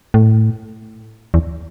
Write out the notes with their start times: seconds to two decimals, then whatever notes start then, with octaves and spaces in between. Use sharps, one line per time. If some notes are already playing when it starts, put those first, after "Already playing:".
0.14 A2
1.34 E2